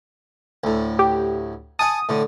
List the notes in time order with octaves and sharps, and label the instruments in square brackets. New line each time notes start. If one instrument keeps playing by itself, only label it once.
[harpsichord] D2 A2
[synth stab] G4
[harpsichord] F#5 G#5 A5 [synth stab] D#6
[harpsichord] A2 D3